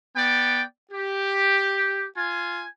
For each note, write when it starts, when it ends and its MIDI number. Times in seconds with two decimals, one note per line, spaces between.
0.16 0.63 59
0.16 0.63 74
0.16 0.63 79
0.92 2.06 67
2.17 2.65 65
2.17 2.65 80